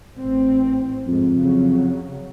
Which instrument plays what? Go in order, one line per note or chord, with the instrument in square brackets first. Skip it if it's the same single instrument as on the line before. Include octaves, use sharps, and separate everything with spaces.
[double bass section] A1 C4
[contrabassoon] F2 [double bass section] G#2
[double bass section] C#3 F#3